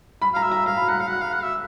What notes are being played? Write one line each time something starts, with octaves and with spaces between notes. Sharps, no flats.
B5
F5 A#5
E5
A#5
F5 A#5
B5
F#5 A#5
F5
F#5
F5
F#5
E5